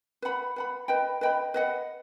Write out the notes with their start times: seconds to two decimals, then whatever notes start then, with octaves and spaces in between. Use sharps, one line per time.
0.22 B4 F#5 B5
0.56 B4 F#5 B5
0.88 B4 D#5 G5 B5
1.21 B4 D#5 G5 B5
1.54 B4 D#5 F#5